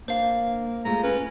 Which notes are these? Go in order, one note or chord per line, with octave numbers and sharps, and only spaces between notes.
A#3 D4 C5 F5
G#3 A3 F4 A#5
C#4 B4